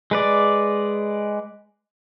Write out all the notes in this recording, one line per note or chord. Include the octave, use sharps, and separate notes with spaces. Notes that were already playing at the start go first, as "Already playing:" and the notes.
G#3 B4 D5